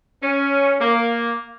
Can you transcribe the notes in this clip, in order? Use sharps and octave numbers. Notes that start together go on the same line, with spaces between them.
C#4
A#3